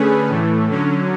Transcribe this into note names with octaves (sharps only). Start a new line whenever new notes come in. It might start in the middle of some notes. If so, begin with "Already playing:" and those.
Already playing: D3 A3 C#4 G#4 B4
A2 E3 A3
D3 F#3 C#4